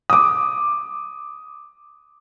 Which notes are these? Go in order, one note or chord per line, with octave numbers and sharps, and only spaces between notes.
D6 D#6